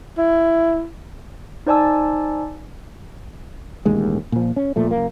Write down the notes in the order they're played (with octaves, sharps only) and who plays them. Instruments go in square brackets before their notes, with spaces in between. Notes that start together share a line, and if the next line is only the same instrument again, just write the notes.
[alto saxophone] E4
[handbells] D#4 C5 D5 G#5 A5 E6
[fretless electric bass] E1 A1 D#2 G#3
A#2 F3
C#4
A#2 F3 A3
F#1 A#3